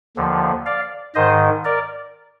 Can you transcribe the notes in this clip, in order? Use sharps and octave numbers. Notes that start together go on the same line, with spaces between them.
D#2 D3 F3
D5 F5
G#2 D#3 C5 D#5
A#4 D5